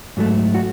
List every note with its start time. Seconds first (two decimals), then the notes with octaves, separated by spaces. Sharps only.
0.17 G#2 F#3 A3
0.54 F#4